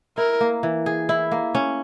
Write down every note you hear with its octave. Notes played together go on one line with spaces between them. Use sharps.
E4 A#4
A#3
E3
G#4
E4
A#3
C#4